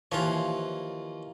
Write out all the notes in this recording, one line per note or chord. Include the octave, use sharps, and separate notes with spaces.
D#2 E3 F3 F4 C#5